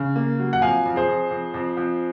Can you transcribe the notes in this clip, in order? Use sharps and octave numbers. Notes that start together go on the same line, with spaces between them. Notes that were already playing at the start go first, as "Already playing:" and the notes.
Already playing: C#3
A#3
F#3
F#5
F2 F5 G#5
F2
G#4 C5
F2
F2
F2
F2